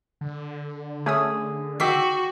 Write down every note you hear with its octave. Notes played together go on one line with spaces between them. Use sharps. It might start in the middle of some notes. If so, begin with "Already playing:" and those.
D3
A3 C#4 G#4 D#6
D#3 F#4 G5 D6 E6 B6 C7